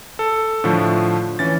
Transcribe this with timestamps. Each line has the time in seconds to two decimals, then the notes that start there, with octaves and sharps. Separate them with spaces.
0.19 A4
0.64 A2 D3 F3 A3
1.39 E3 C#4 A6